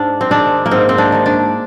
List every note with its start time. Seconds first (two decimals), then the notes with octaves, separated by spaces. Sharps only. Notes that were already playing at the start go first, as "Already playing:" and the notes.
Already playing: G#2 D4
0.21 C4
0.31 D#3 G#3 D4
0.66 A#3
0.71 G#2 C4
0.89 C4
0.98 D4
1.12 D#3 G#3
1.26 D4